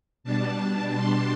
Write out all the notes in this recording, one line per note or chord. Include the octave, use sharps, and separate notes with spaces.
B2 G3 D4 A5
C6